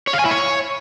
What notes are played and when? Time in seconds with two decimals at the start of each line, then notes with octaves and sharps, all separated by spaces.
0.07 C#5
0.13 F5
0.19 G#5
0.25 E4
0.31 C#5